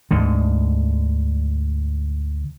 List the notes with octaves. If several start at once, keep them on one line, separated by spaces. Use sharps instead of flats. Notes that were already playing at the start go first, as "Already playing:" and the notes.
D2 G#2 D3